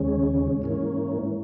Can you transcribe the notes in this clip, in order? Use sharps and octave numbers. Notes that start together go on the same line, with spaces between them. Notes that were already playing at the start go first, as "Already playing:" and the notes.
Already playing: D#2 C#3 G#3 C#4
G#2 E3 A#3 C#4